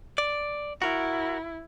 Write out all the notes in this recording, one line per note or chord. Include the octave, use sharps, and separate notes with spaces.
D5
E4 F#4 A#4